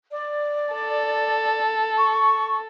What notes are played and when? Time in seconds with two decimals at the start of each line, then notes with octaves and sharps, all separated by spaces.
0.12 D5
0.75 A4
1.98 C#6